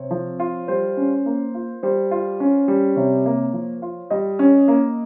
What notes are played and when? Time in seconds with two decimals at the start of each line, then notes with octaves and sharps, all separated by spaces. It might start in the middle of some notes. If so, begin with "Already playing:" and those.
Already playing: C3 C4 C#5
0.11 F3
0.40 F4
0.68 G3 C5
0.97 C#4
1.26 A#3
1.54 F4
1.83 G3 C5
2.11 F4
2.40 C#4
2.68 G3
2.96 C3 C#5
3.26 A#3
3.53 F3
3.82 F4
4.10 G3 D#5
4.39 C#4
4.68 A#3